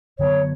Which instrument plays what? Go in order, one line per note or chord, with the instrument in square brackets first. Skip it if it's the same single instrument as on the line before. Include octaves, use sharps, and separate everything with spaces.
[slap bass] F#2 D3 F#3 B3 [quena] C#5